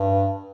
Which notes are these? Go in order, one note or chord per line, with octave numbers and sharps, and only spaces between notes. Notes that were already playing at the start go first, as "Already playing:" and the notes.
Already playing: G2